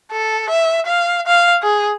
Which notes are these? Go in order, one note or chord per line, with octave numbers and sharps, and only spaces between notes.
A4
E5
F5
F5
G#4